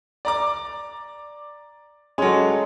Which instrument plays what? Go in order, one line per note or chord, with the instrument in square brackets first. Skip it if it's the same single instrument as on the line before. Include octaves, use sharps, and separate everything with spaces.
[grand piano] D5 A#5 D6
[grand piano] F#3 C#4 [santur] G#3 A4